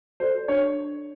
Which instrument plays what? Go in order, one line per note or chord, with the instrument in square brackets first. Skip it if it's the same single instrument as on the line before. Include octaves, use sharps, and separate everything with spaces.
[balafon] F#4 A4 D5 [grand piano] C5
[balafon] D4 [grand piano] C#5